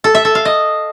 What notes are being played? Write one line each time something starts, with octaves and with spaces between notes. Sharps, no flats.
A4
E5
A4
F5
D#5